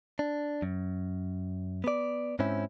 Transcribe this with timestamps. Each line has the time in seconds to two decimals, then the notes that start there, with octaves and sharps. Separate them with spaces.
0.19 D4
0.62 F#2
1.84 B3 D5
2.39 G#2 C4 C#4 E4